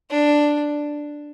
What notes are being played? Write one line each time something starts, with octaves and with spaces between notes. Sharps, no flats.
D4